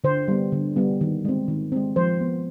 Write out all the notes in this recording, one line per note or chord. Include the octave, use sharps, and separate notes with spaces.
D3 C5
G3 B3
D3
G3 B3
D#3
G#3 C4
D#3
G#3 C4
F3 C5
B3